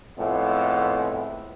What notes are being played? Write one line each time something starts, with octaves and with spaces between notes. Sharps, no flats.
F2 A2 G#3 B3